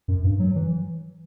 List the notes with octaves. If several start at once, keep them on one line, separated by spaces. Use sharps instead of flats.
F#2
G2
F#3
E3